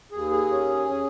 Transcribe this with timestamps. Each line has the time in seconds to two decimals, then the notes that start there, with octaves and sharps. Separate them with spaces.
0.12 D#2 G#4
0.31 G#4
0.50 C#4
0.88 C#4